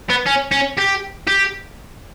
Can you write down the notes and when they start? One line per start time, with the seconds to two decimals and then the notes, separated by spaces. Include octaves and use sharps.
0.10 B3
0.26 C#4
0.51 C#4
0.77 G4
1.27 G4